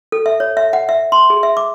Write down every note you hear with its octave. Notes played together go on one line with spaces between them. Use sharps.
A4
E5
C#5
E5
F#5
E5
C6
G#4
E5
D6